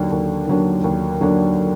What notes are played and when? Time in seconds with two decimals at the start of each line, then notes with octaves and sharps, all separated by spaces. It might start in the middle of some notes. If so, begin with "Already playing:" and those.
Already playing: D#2 D3 F#3 A#3 D4
0.12 D#2
0.48 D3 F#3 A#3 D4
0.84 D#2
1.21 D3 F#3 A#3 D4